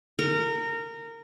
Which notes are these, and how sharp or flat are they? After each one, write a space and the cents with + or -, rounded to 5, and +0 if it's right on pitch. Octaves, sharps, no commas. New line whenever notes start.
A#4 -20